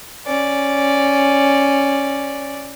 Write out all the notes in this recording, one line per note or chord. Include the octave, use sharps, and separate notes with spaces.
C#4 D5